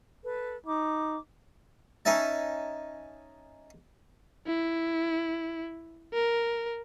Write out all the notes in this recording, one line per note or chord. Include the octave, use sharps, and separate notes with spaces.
A4 B4
D#4 D6
C#4 D#4 E5 A5
E4
A#4